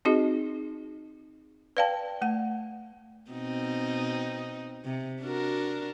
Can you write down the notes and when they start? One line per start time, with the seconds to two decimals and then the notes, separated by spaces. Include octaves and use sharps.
0.05 C4 D#4 F#4 G#4 D#5
1.77 B4 D5 F5 G5 A5
2.21 A3 F#5
3.31 B2 C4 D#4
4.84 C3
5.22 D4 F#4 A#4